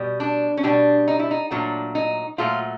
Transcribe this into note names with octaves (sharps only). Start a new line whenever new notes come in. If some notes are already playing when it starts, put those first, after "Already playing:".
Already playing: B2 G3
D4
C#4
B2 G3 D4
D#4
E4
D#4
A#2 F#3 A3 D4
D#4
A#2 F#3 A3 F4